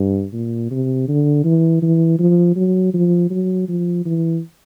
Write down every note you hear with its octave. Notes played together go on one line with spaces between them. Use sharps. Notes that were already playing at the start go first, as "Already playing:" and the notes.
Already playing: G2
A#2
C3
D3
E3
E3
F3
F#3
F3
F#3
F3
E3